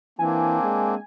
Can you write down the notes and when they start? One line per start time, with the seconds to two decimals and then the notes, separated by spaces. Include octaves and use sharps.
0.19 E3 A#3 C4 D4 G#5
0.62 G#3